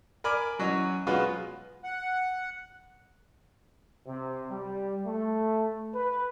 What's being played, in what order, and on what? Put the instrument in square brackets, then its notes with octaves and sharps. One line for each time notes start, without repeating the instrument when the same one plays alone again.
[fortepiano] A#4 D5 G#5 B5 D6 F6
E3 F#3 C#4 D#5
F#3 G#3 B3 F4 F#4 B4
[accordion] F#5
[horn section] C3
G3
A3
B4